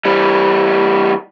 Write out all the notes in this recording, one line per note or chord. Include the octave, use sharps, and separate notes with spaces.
E3 G3